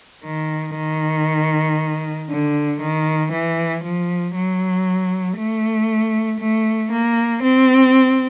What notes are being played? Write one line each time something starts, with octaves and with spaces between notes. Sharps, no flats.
D#3
D#3
D3
D#3
E3
F3
F#3
A3
A3
A#3
C4